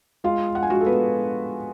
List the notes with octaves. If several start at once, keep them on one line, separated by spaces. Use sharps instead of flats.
G#3 F4 F5
F#5
G#5
G#3 F#4 F#5
A4
B3 B4